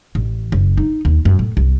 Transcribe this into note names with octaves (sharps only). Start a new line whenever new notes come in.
A1
F#1
D#4
D#2
F#2
A2
C2